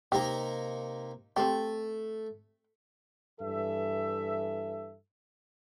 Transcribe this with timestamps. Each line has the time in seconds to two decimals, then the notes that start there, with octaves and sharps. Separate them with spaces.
0.12 C3 A#3 D#4 G4
1.36 A3 C4 G4
3.40 G2 E3 A4 E5